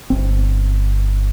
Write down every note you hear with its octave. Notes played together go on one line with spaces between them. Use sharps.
G1 C4